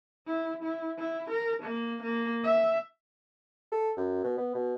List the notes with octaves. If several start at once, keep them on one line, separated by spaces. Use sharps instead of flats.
E4
E4
E4
A#4
A#3
A#3
E5
A4
F#2
B2
B3
B2